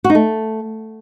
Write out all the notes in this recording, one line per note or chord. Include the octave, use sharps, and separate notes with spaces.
F#4
D#4
A3